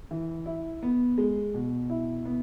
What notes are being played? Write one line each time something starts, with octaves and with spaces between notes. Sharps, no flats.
E3
E4
B3
G#3
B2
E4
B3